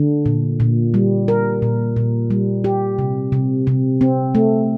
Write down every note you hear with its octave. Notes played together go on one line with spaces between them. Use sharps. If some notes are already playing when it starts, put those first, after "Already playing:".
Already playing: D3
A#2
A#2
G3
A#4
A#2
A#2
G3
G4
C3
C3
C3
C4
A3